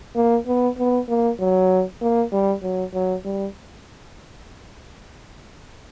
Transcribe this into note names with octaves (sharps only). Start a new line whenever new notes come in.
A#3
B3
B3
A#3
F#3
A#3
G3
F#3
F#3
G3